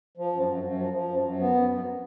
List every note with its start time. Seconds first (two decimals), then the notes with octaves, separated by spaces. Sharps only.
0.17 F3
0.33 F#2
0.48 F#2
0.63 F#2
0.79 F3
0.93 F3
1.09 F#2
1.24 F#2
1.39 B3
1.54 F#2
1.69 F#2